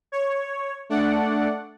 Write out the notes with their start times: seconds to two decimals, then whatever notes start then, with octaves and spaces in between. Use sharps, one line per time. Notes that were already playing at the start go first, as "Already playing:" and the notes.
0.12 C#5
0.89 A3 D4 D5 F#5